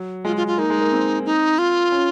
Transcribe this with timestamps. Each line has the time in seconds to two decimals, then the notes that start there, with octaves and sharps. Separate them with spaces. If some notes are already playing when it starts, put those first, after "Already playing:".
Already playing: F#3
0.25 G#3 F4
0.36 F4
0.47 F4
0.58 A#3 D#4
0.70 G#3
0.81 A#3
0.92 C4
1.25 D#4
1.58 F4
1.92 C#4